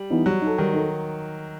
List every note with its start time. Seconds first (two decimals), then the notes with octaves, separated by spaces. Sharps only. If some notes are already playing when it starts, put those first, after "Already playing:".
Already playing: G3
0.10 E3 B3 D#4
0.26 F#3 G3
0.42 D#4
0.47 A4
0.58 D#3 G3
0.73 D#4 A4